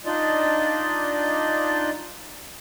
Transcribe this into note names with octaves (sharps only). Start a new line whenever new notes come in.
D4 D#4 F4 D5 D#5